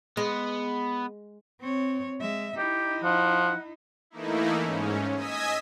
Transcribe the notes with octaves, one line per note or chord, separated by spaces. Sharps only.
G#3 B3
C4 C#5
G#3 E5
D#4 E4 G4
F3 F#5
E3 A3 A#3 D#4 E4
G#2 C#4
D#5 G#5 D#6 E6 G#6 B6